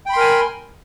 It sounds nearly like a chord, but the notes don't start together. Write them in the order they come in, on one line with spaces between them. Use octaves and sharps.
G5 B5 C6 A#4 G#5